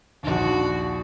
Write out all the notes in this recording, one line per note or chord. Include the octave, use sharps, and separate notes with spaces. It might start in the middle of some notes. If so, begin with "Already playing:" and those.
A#1 D#2 D4 F#4